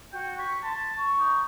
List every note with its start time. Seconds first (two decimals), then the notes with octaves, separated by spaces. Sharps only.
0.12 F#4 G5
0.38 C#6 B6
0.63 A5 C6
0.97 C#6
1.19 D#4